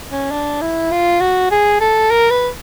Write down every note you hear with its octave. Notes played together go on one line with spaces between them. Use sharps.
C#4
D4
E4
F4
F#4
G#4
A4
A#4
B4